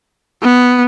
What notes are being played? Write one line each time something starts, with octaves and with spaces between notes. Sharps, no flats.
B3